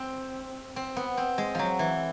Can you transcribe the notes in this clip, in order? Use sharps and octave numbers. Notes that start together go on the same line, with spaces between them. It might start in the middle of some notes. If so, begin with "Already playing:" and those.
Already playing: C4
C4
B3
C4
G#3
F3 F#3
E3